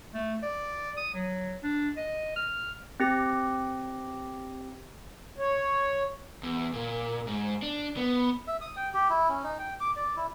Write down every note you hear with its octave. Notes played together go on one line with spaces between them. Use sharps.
A3
D5
D#6
F#3
D4
D#5
F6
C4 G4 A#6
C#5
E2
A#2
G#2
D4
B3
E5
D#6
G5
G4
E4
C#4
D#4
G5
D6
D5
E4